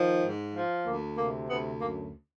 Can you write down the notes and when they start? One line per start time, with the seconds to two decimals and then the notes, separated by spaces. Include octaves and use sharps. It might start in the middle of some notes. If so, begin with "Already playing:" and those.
Already playing: D#3 F3
0.23 G#2
0.55 F3
0.86 D2 A#3
1.17 C3 A#3
1.49 D2 B3
1.81 F#2 A#3